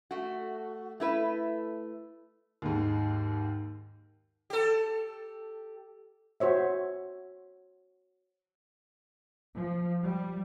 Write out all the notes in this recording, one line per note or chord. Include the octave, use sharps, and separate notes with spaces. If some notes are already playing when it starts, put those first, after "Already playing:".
A3 F#4
A3 E4 B4
D#2 G#2
G4 A4
F#4 C5 C#5 E5
F3
G3